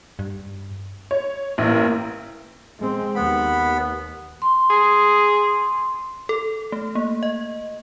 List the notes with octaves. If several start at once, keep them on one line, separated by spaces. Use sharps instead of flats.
G2
C#5
A1 A#3 E4
G#3 C4
D#2 B3 B5
C6
G#4
A4
A3
A#3
D#5